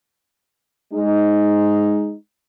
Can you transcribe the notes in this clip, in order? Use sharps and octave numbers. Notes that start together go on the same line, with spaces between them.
G#3 D#4